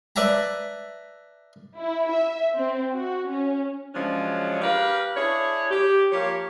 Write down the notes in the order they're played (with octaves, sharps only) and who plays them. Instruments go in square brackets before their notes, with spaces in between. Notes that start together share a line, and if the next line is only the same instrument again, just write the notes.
[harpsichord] B4 D5 E5 A5 A#5
[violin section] E4
E5
C4
F#4
C#4
[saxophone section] C#3 F3 F#3 G#3 C#4 D4
G4 A#4 B4 F5
D4 E4 G#4 C#5
G4
F3 A#3 G4 C#5